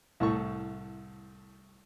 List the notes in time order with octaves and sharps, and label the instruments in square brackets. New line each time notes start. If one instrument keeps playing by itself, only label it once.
[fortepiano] C2 A2 A4 C#6